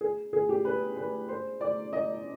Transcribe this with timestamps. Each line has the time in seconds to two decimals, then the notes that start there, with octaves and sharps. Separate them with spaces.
0.01 G#4
0.33 G#4
0.49 G4
0.65 B4
0.97 B4
1.29 C5
1.61 D5
1.93 D#5